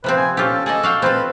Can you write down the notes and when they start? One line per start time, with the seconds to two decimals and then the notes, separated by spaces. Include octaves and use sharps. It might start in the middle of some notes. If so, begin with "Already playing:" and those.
0.04 C3 F3 C4 B4
0.17 G#5
0.37 C#4 F4 G4 A4
0.66 G#4 A4 D5 D#5
0.83 F#4 F5 G5
1.02 C4 F4 A4 B4